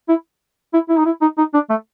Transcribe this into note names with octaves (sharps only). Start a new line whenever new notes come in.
E4
E4
E4
D#4
E4
D#4
D#4
D4
A3